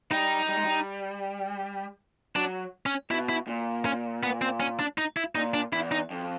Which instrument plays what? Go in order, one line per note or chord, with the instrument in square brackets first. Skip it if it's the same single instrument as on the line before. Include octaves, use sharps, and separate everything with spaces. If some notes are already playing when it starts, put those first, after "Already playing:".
[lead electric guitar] G3 [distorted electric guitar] D#4
[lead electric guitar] G3
G#3
G3
[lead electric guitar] F#3 [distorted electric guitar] D4
[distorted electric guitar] C#4
[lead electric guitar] B2 [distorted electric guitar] E4
[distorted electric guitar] E4
[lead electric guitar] A#2
[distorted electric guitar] C#4
B3
C4
C#4
D4
D#4
E4
[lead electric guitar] A#2 [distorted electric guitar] D#4
[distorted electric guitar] D4
[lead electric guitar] E2 [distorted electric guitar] E4
[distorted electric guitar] D#4
[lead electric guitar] F2